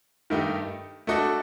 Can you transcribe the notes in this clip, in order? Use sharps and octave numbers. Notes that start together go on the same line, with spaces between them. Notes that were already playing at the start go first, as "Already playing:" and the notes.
G2 D#3 A3 D#4 G4
A3 D4 F#4 A4 D#5